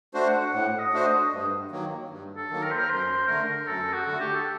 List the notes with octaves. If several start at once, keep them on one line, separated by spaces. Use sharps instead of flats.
A3 D4 F#4 C5
F#5
A2 F#5
D#5
A3 D4 F#4 C5
D#5
G2
D#3 F#3 A#3
G2
A4
D#3 F#3 A#3
A#4
C5
A#4
F#2 C5
D3 A3 A#4
F#2 A4
F#4
D3 A3
G4
A4